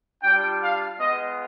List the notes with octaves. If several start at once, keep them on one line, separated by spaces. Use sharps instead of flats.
G3 D4 F4 G5
F5
G#3 B3 F4 D#5